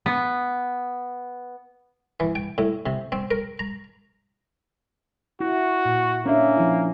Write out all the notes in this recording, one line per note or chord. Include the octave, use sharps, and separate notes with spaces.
B3
E3
G5
A2
C3
C4
A#4
A#5
E4 F#4
A#2
A#3 C#4 D4 E5
F3 E4